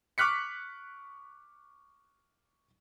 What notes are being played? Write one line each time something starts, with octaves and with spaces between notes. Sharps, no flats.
C#6 D6 F6 F#6 B6 C#7